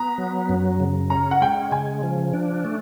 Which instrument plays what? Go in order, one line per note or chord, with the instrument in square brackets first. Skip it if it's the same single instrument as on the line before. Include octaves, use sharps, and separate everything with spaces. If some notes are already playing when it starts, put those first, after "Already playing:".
Already playing: [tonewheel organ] B3 [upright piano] A#5
[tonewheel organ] F#3
F#2
C#3
[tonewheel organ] C#4 [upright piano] A#5
[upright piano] F#5
[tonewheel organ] G#3 [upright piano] G5
[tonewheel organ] C#3 [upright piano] G#5
[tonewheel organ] F3
D4
A3